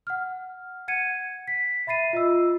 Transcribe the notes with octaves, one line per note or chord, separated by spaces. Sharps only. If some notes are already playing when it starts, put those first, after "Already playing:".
F#5 F6
F#5 G#6 C#7 D#7
B6
E5 B5 A6 C7 D#7
F4 D#5 E6